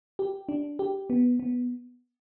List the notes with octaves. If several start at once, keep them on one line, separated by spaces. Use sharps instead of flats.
G4
D4
G4
B3
B3